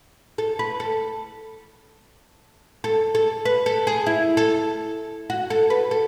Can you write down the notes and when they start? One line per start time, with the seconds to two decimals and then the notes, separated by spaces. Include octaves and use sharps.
0.38 A4
0.59 B4
0.80 A4
2.84 A4
3.15 A4
3.45 B4
3.66 A4
3.87 G#4
4.06 E4
4.37 A4
5.30 F#4
5.50 A4
5.70 B4
5.91 A4